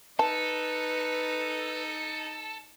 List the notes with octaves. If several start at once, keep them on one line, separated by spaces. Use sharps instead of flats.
D#4 A4 B4 A5